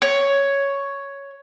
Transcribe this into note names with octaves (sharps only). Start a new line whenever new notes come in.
C#5